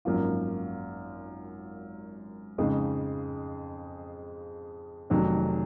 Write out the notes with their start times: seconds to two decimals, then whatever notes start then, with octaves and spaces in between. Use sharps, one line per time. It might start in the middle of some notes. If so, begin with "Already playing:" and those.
0.05 G#1 F#2 F3 A#3 F4
2.58 F2 C#3 G#3 D#4
5.10 F1 F2 D#3 F#3